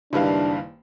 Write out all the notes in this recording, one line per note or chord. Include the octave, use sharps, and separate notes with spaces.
F#1 D#3 G3 D4 E4 B4 F5